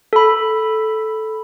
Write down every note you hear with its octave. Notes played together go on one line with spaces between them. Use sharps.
A4 B5